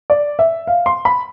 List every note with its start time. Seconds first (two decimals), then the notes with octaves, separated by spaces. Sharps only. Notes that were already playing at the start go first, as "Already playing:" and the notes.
0.10 D5
0.39 E5
0.67 F5
0.86 C6
1.05 B5